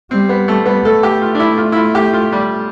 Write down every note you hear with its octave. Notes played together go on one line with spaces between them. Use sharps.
G3 C4
B3
A3
B3
A3 A4
G4
F4
D4
E4
F4
E4
F4
G4
F4
G3